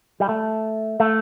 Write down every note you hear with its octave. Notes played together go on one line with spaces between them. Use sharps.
G3
A3
A3